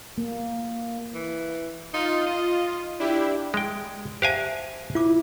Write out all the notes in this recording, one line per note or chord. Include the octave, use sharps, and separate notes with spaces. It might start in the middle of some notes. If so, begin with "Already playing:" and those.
A#3
E3
D#4 F4
D#5
D4 E4 G4
G#3 G5
G4 C5 E5 F5 G#5 A5
E4 F4 D6